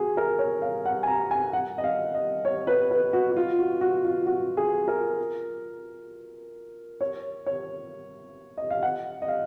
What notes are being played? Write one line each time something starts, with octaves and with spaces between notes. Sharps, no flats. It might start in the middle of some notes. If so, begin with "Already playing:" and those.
Already playing: F#4 G#4
A#4
C#5
F5
F#5
G#5
A#5
G#5
F#5
D#5
F5
D#5
C#5
B4
B4
F#4
F#4
F4
F#4
F#4
F4
F#4
G#4
A#4
C#5
C#5
D#5
F5
F#5
D#5
F5